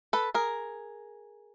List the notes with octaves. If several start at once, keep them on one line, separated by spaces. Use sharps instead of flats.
A4 B4
G#4 A#4